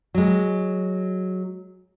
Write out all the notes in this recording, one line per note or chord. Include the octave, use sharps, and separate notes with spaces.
F#3 G#3